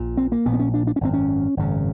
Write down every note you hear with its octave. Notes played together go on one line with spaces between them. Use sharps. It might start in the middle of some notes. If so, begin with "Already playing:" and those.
Already playing: A#1 A#2
C4
A#3
A#1 A#2 B3
C4
C#4
D4
D4
C#4
G#1 F#2 C#3 C4
C#4
G#1 F#2 C#3